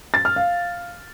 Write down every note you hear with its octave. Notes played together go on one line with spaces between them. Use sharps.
A6
F6
F5